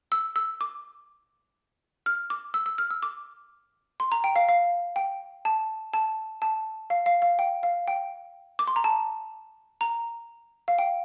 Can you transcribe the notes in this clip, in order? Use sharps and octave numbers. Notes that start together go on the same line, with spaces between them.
E6
E6
D6
F6
D6
E6
E6
F6
E6
D6
C6
A#5
G5
F5
F5
G5
A5
A5
A5
F5
F5
F5
G5
F5
G5
D6
C6
A#5
A5
A#5
F5
G5